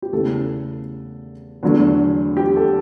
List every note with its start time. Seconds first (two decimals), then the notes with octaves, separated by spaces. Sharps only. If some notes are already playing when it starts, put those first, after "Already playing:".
0.02 G4
0.13 E2 C#3 E3 A3 A4
1.63 E2 D3 F#3 A3
2.37 G4
2.56 A4